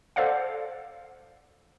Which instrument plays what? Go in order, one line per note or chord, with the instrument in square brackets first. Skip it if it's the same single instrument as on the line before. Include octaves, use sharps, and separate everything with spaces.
[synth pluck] A4 C5 D5 F5 F#5